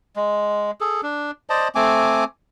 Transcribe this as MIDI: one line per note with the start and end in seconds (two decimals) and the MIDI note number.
0.16 0.71 56
0.81 1.01 68
0.81 1.01 69
1.03 1.31 62
1.50 1.68 72
1.50 1.68 74
1.50 1.68 75
1.50 1.68 81
1.75 2.24 57
1.75 2.24 60
1.75 2.24 80
1.75 2.24 86